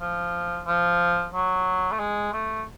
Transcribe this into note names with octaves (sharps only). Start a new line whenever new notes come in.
F3
F3
F#3
A3
G#3
A3